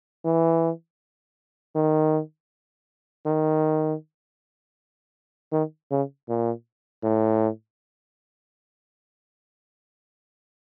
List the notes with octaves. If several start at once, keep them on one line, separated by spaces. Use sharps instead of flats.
E3
D#3
D#3
D#3
C#3
A#2
A2